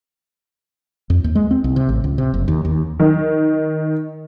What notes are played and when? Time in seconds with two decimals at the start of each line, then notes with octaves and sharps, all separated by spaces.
1.10 F2
1.24 D#2
1.35 G#3
1.51 C4
1.64 C2
1.76 C3
1.89 A1
2.04 C#2
2.18 C3
2.34 F#1
2.48 D#2
2.65 D#2
3.00 D#3